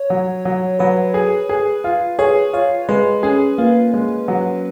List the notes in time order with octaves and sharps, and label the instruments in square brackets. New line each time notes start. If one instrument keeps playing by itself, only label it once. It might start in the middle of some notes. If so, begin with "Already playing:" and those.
Already playing: [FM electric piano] C#5
[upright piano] F#3
F#3
[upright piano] F#3 [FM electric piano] B4
[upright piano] G#4
G#4
F4
[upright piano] G#4 [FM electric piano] C#5
[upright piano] F4 [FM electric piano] C#5
[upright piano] G#3 [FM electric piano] B4
[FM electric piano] C#4 [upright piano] G#4
[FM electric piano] A#3 [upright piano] F4
[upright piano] G#3
F#3